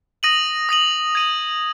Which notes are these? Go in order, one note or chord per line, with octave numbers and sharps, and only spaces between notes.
D#6 A#6 D#7 F#7
D#6 A#6 D#7 F#7
G#6 D#7 F#7